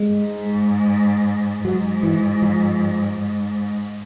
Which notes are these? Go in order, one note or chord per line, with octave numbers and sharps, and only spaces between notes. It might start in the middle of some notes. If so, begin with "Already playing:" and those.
Already playing: G#3
G#2
G#2 F#3
E3
F3
G#2